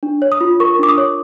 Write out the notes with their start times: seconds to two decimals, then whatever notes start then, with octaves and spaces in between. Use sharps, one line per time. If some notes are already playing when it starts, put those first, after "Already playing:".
0.03 D4
0.22 C#5
0.32 D#6
0.41 F4
0.60 A#4 C#6
0.79 D4 D6
0.89 D#6
0.98 C#5